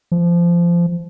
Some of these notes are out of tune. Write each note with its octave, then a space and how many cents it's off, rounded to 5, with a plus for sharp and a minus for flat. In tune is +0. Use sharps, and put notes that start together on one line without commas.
F3 -20